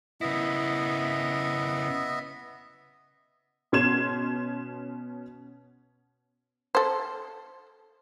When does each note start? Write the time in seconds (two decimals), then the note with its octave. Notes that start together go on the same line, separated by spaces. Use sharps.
0.21 C#3 B3 E4 D#5 E5
3.72 B2 C#4 C6 G#6 E7
6.75 A4 C5